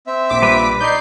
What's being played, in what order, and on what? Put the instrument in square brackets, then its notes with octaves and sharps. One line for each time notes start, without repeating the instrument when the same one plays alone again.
[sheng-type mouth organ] C4 E5
[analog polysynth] A#1 D6 B6
[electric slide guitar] G3 B4
[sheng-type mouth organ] D#4 D5 [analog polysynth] G6 C7